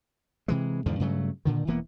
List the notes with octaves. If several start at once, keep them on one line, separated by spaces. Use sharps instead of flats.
C3 E3 G#3
E2 G#2 D3 F3
G2 C#3 F#3 A3
A#2 D3 D#3
E1 E3 A#3 B3